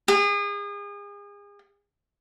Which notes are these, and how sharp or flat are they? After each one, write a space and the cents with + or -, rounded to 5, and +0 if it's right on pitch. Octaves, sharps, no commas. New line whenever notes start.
G#4 -35